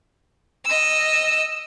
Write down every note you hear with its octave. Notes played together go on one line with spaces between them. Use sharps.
D#5 E6